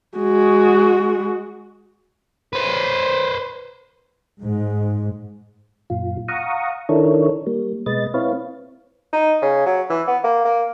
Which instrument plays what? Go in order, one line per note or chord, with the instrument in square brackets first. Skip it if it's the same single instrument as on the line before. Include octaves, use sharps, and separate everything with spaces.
[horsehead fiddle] G#3 F#4
[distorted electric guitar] B4 C5
[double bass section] G#2
[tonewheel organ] F#2 A#2 F4
F5 F#5 A#5 C#6 D#6
D#3 D4 E4 A4 A#4 C#5
G3 A#3
B2 G#3 B4 D#5 A6
C4 E4 B4 C#5 F5
[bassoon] D#4
C#3
F#3
E3
B3
A#3
A#3